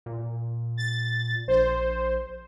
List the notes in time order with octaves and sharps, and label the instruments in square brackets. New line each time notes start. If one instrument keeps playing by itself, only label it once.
[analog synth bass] A#2
[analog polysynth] A6
[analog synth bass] A#1 [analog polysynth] C5